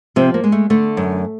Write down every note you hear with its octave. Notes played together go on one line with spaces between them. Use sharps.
C3 F3 C4
A#3
G#3
A3
D3 A3
F#2